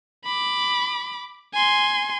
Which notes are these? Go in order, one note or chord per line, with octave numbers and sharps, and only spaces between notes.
B5 D6
G#5 C6